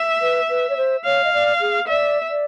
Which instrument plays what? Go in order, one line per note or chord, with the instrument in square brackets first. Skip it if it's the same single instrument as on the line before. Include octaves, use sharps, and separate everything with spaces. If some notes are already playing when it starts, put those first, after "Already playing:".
Already playing: [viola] E5
[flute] B4
B4
C#5
C5
[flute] C#5 [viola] F5
[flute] D#5
D5
G#4
[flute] D5 [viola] E5
[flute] D5